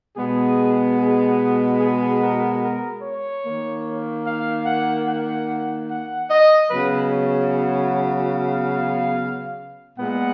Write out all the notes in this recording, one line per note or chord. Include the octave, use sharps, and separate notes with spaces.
B2 G#3 B3 G#4
G#4
G#4
A#4
A#4
C#5
D#3 A#3
F5
F#5
F#5
F#5
D#5
C#3 F#3 B3 B4
C#5
F5
A#2 G#3 B3 F#5